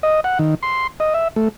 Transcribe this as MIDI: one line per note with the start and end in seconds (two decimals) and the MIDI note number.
0.03 0.20 75
0.24 0.38 78
0.39 0.55 51
0.63 0.87 84
1.00 1.14 75
1.14 1.28 76
1.36 1.48 57